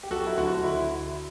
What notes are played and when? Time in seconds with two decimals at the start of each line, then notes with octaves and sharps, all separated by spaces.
0.03 G4
0.10 F#3 F#4 A4
0.27 E4
0.37 D2 F#4
0.64 D3 E4